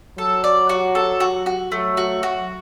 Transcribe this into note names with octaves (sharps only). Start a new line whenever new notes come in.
F#3 A4
D5
F#4
A4
F#4
F#4
F#3 A3
F#4
F#4